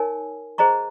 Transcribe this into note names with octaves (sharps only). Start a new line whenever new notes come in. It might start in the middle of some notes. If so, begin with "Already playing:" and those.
Already playing: D#4 A#4 C#5 G#5
G#4 C5 D#5 A#5 C#6